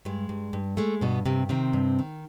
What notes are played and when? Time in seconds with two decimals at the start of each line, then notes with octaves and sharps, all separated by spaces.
0.05 G2 G#3
0.29 G2
0.53 G2
0.77 G#3 A3
1.01 G2 B2 B3
1.26 G2 C3 C4
1.49 C3 D#3 C4
1.73 G2
1.99 D#3